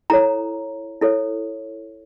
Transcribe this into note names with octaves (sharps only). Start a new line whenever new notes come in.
E4 A4 C#5 A#5
E4 A4 C#5